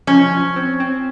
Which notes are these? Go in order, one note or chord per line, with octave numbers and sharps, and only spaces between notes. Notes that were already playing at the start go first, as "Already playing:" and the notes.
F3 C#4
F3
C4
C4